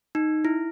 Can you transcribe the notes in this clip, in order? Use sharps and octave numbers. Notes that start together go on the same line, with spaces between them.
D#4
E4